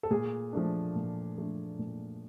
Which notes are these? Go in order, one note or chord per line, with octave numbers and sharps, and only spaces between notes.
A4
A#2 G#4
F3 A3 D4
A#2
F3 A3 D4
A#2